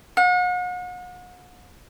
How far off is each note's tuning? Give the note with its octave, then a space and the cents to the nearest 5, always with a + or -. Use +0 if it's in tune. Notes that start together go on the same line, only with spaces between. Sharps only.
F#5 -40